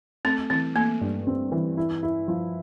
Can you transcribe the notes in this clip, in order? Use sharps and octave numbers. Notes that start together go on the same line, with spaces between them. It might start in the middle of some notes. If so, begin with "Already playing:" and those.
A3 C4
E3 C4
A3 A#3
G2
C4
E3
E4
E4
F3